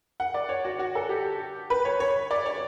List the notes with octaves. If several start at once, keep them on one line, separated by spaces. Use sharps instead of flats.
F#5
D5
C#5
F#4
F#4
A4
G4
B4
C#5
C#5
D5
C#5